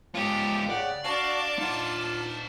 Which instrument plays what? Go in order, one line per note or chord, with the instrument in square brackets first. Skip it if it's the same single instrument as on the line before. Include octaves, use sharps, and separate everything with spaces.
[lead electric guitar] G#2 F4 [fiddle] G4 [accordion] A5
[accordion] C#3 F#5 [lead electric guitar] D5
[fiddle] D4 A5 [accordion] F#4 F5
[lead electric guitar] D#4 F#5 [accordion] F4